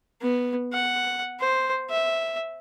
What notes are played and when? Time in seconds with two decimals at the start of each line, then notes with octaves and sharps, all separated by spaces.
0.22 B3
0.73 F#5
1.40 C5
1.90 E5